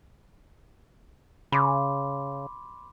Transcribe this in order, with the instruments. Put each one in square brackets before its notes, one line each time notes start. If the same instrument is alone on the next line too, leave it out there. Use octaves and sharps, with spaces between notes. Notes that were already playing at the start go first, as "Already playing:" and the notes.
[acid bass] C#3 [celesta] B5 C6 D6